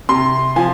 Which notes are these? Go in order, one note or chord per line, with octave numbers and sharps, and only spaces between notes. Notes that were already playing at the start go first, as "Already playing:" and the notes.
C3 C6
F3 G#5